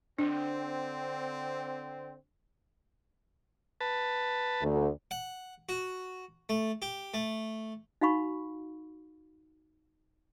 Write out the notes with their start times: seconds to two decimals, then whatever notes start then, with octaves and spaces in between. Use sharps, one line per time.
0.18 D3 C4 D4
3.81 B4 A5
4.61 D2
5.11 F#5
5.69 F#4
6.49 A3
6.82 G4
7.14 A3
8.01 D#4 F#4 F5 B5 C#6